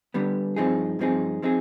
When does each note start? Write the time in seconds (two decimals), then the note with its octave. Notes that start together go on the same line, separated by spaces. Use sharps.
0.14 D3 G3 B3
0.56 G2 F3 C4 D#4 G#4
0.99 G2 F3 C4 D#4 G#4
1.42 F3 C4 D#4 G#4